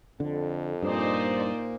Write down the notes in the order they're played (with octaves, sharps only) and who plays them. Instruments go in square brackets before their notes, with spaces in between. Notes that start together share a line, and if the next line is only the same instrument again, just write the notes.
[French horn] F2 [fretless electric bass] D3
[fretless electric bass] G2 [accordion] A#2 [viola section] D#4 C5 D5